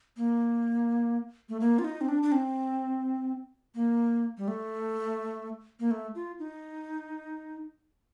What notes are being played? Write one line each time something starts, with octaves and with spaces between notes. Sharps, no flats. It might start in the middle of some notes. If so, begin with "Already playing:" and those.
A#3
A3
A#3
F4
D#4
C4
D4
D4
C4
A#3
G3
A3
A#3
A3
F4
D#4